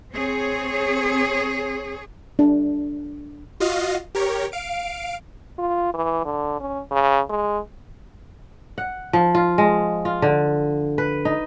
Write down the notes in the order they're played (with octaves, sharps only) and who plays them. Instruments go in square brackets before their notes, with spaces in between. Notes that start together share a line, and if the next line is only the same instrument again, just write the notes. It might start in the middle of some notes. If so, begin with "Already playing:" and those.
[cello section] C4 G#4 C#5
[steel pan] D4
[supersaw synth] F4 F#4 D#5 F5
G4 A#4 C#5
F5 D7
[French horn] F4
E3
D3
C#4
C#3
G#3
[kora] F#5
F3
F4
G#3
F4
D3
B4
D#4